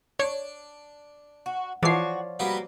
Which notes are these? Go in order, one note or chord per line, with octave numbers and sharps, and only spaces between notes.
D4 C#5
F#4
E3 F3 F#4 C#5 D5 C7
G3 A#3 B3 F#4